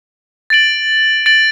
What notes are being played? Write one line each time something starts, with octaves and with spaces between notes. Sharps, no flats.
A6 D7 F#7
A6 D7 F#7